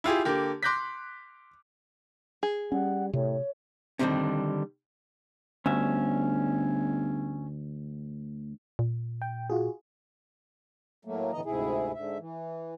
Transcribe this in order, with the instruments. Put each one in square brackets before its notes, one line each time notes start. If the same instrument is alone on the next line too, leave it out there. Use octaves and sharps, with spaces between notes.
[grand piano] E4 F4 G4 G#4
D3 A#3 G4
C6 D6 F#6 G6 A#6 B6
[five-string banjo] G#4
[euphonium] G3 [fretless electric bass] C#4 [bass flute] F#5
[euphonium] A2 [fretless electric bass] C3 [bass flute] C#5
[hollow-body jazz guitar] D3 D#3 F3 G3 C4 C#4
[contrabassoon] G1 [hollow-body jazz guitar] D2 [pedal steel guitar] C#4 E5
[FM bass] A#2
[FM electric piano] G5
F4 F#4 G#4
[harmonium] A2 F#3 A3 A#3
A2 D3 E3 B3 D#5 A#5
D2 G#2 C3 E4 G#4
G#2 D3 E5
E3